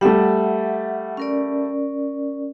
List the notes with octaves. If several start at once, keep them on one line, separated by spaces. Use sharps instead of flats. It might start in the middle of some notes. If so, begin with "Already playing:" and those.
G3 A3 E5 F#5
C#4 A#4 D5